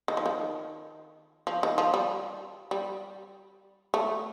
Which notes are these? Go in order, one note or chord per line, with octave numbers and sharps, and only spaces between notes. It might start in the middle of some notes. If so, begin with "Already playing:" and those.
D#3
F3
D#3
F3
D#3
F3
G3
G3
A3